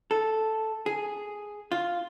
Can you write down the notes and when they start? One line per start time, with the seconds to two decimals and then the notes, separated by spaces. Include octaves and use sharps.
0.11 A4
0.86 G#4
1.72 F4